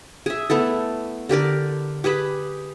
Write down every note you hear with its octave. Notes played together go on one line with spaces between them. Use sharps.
G#4 E5
A3 B3 E4 A4
D3 G4 A#4 D5
G4 G#4 B4 B5